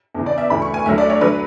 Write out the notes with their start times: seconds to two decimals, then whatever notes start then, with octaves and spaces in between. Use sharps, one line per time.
0.14 E2 C#3 E3
0.26 D5
0.38 E5
0.50 D2 C#3 E3 B5
0.62 C#6
0.74 G#5
0.86 D2 D3 F#3 E5
0.98 D5
1.09 C#5
1.21 D3 F#3 B4